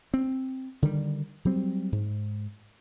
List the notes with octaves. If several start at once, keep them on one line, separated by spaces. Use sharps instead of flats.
C4
D3 D#3 G3
F#3 G3 C4
G#2